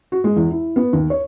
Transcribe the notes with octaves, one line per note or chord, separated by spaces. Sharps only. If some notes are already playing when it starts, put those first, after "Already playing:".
F#4
G#3
E2
E4
B3
D#2
C#5